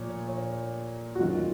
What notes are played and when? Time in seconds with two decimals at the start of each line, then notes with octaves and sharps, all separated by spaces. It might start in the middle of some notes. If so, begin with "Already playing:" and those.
Already playing: A#2 F3 C#5
0.28 C#5
1.15 F#4
1.19 F#2 D#3 F#3 F4